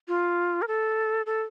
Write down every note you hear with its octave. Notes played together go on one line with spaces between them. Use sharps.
F4
A#4
A4
A4